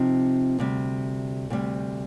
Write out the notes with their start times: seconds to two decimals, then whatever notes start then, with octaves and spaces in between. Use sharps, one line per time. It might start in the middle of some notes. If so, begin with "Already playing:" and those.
Already playing: C3 F3 C4 D#4
0.59 D2 C3 G3
1.50 D2 C3 G3